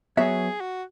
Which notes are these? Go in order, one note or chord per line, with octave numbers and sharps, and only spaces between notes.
F#3 B3 F#4 G#4 C#5 E5
F#4